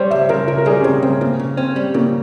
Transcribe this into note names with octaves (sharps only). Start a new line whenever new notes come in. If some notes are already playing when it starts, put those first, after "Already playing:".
Already playing: G3 C5 C#5
C#2 E5
C#3 A#4
C#2 A#4
A#4
G3 G#4
C#4
C#2 C4
C#2 C4
C#3 A#3
C#3
C4 C#4
G3
C#3 A#3